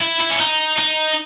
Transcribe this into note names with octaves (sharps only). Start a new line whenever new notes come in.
E4
E4
C#4
D#4
D#4